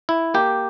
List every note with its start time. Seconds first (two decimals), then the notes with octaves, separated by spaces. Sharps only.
0.09 E4
0.34 A#3 G4